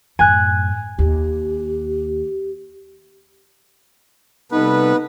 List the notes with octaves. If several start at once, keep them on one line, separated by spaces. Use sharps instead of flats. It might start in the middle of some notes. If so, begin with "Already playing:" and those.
F#2 A2 G#5 F#6
D#2 G4
C3 G3 B3 D#4 A4 B4